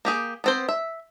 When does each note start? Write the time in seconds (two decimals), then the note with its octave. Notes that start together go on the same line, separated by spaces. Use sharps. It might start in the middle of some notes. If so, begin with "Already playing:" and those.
0.05 A#3 G4 G#4
0.44 B3 C4 C5
0.69 E5